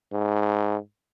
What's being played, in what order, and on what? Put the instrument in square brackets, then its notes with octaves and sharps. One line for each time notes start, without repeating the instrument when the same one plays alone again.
[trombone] G#2